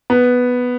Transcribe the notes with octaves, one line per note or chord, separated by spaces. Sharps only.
B3